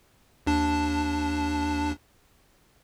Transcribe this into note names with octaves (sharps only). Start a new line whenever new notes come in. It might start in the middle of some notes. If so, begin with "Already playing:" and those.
D#2 D4 A5